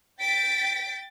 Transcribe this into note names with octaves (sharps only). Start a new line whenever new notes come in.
G5 A6 B6 D7